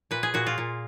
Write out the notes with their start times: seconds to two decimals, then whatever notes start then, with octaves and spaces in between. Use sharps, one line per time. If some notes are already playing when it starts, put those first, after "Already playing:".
0.11 A#2 B4
0.23 G#4
0.34 A#2 F#4
0.46 F4
0.58 A#2